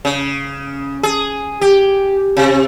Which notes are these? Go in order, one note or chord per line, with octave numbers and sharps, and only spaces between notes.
C#3
G#4
G4
C3